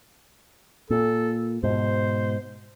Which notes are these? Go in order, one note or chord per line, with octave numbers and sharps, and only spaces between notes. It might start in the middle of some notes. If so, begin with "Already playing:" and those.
A#2 A4
G#2 B2 C5